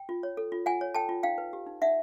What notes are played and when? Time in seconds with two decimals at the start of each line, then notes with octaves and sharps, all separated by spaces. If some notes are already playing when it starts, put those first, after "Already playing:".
Already playing: G5
0.09 F4
0.23 C#5
0.37 A4
0.52 F4
0.66 F4 F#5 G#5
0.81 C#5
0.94 A4 G5 A5
1.09 F4
1.23 D#4 F5 G5
1.38 B4
1.53 G4
1.67 D#4
1.81 D#4 E5 F#5